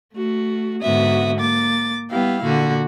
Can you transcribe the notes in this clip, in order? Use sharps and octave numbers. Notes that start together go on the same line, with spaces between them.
A3 F#4
G#2 D3 B3 F#4 E5 D#6
A#3 D6 A6
G3 B3 E4 G4 F5
A#2 D3 F#4